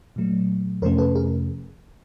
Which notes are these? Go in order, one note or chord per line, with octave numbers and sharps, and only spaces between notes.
A#2 F#3 A3
F2 C3 F3 A3 C#4 A#4 C5
A4 B4
G#4 A#4